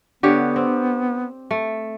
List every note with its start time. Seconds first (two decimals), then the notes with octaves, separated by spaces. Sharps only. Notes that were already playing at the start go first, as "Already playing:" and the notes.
0.23 D3 B3 G4 C#5
0.56 C4
1.51 A3